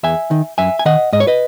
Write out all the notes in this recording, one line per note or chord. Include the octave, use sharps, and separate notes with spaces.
E2 E5 G#5
D#3
F#2 E5 G#5
G#5
D#3 D#5 F#5
G#2 D#5
C#5
B4 D#5